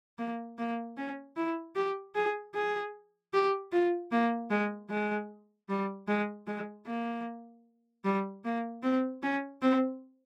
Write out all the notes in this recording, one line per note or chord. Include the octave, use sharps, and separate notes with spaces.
A#3
A#3
C#4
E4
G4
G#4
G#4
G4
F4
A#3
G#3
G#3
G3
G#3
G#3
A#3
G3
A#3
C4
C#4
C4